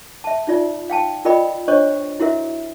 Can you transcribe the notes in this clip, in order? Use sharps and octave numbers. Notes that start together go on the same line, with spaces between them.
E5 A5
D#4 F4 D5
F5 G5 A5
F4 A#4 D5 D#5 G5 B5
D4 C5 C#5 D#5 C#6
E4 F#4 A#4 E5